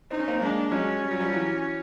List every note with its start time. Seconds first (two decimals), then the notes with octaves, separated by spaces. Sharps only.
0.11 C4 D#4
0.19 C#4
0.28 A#3 C4
0.41 G#3 A#3 D4
0.72 F#3 G#3 C#4
1.03 G3
1.11 F#3
1.20 F3 G3
1.32 E3 F#3